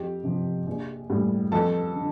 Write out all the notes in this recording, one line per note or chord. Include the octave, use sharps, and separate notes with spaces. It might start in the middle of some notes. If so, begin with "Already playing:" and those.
Already playing: F2 G4
C3 F3
A#1
A2 G3
F2 A4 A5
D3